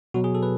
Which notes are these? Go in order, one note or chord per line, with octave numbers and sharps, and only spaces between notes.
B2 F#3 F#4
G#4
A4
B4